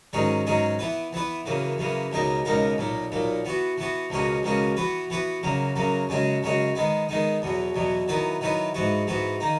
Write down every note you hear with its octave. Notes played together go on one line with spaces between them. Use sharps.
G#2 D#3 F#3 C#4 G#4
G#2 D#3 F#3 C#4 G#4
E3 B3 E4 B4
E3 B3 E4 B4
F#2 C#3 E3 A#3
F#2 C#3 E3 A#3
C#2 B2 A#3 D#4 A#4
C#2 B2 A#3 D#4 A#4
B1 A#2 A#3
B1 A#2 A#3
E3 B3 F#4
E3 B3 F#4
C#2 B2 A#3 C#4 F#4
C#2 B2 A#3 C#4 F#4
E3 B3 F#4 B4
E3 B3 F#4 B4
F#2 C#3 F#3 A#3
F#2 C#3 F#3 A#3
F#2 C#3 G#3 C#4 F#4
F#2 C#3 G#3 C#4 F#4
D#3 G#3 B3 D#4
D#3 G#3 B3 D#4
E2 B2 F#3
E2 B2 F#3
D#3 F#3 B3 E4 B4
D#3 F#3 B3 E4 B4
G#2 E3 B3 F#4
G#2 E3 B3 F#4
D#3 A#3 D#4